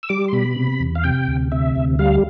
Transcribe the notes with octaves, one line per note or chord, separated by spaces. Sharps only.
E6
G3 D6
C6
B2 B5
C3
E2
F5
C3 G5
D2
C3 E5
D2
G3 F5